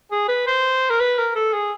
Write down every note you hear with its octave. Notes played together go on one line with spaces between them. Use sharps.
G#4
B4
C5
A#4
B4
A#4
A4
G#4